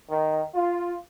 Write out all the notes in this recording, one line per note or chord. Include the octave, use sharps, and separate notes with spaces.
D#3
F4